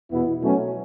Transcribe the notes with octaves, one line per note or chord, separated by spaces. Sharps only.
E2 B2 B3 E4
B2 F#3 A3 C#4